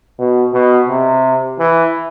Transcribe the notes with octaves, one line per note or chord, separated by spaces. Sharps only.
B2
B2
C3
E3